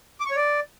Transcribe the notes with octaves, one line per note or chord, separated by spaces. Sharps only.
D6
C#6
C#5
D5